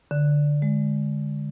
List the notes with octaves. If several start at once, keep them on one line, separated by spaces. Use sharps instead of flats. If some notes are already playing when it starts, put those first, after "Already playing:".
D3
G#3